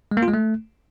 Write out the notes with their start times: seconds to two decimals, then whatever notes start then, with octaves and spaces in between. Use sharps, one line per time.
0.11 G#3
0.17 A#3
0.22 F4
0.28 G#3
0.34 A3